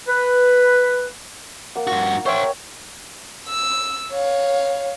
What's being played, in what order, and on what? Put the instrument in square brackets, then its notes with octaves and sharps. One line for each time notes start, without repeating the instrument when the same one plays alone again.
[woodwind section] B4
[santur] A#3 F#5
[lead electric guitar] G2 F#4
[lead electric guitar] A#4 C5 [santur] C#5 E5 G5
[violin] E6
C#5 F5